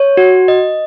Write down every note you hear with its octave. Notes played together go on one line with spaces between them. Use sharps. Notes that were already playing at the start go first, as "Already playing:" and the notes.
Already playing: C#5
F#4
D#5